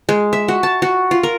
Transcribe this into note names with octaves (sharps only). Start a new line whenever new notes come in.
G#3
E5
F#4
A5
F#4
F4
A#4